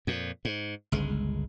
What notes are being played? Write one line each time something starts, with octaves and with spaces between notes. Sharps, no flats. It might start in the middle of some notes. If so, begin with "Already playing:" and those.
F2 A#2
G#2
G1 C#2 G#3